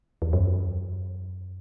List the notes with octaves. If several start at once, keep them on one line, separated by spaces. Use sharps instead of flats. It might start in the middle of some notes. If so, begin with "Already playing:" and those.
E2
F#2